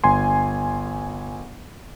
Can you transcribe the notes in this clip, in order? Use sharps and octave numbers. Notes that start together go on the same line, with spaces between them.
G1 G#5 C6